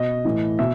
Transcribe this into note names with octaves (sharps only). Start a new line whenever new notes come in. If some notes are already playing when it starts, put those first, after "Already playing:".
Already playing: B2 D#5
A2 E3
B2 E5